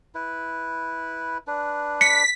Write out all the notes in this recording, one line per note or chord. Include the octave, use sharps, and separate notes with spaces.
E4 B4
D4 B4
B6 C#7